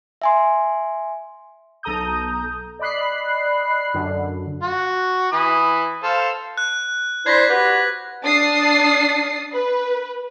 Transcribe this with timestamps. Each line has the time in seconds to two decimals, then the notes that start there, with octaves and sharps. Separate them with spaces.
0.22 E5 G#5 C6
1.83 B1 A4 A#5 D#6 G6
2.79 D5 D#5 B5 F#6 C7
3.94 F#2 D3
4.62 F#4
5.32 E3 B5 D#6
6.03 A4 C5 F5
6.58 F#6
7.26 D4 E4 C5 G#6 A#6 B6
7.48 F#4 G4 B4
8.24 D4 D#6 A6 C7
9.53 B4